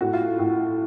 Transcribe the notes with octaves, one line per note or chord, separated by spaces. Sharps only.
A2 F#4
F4
A2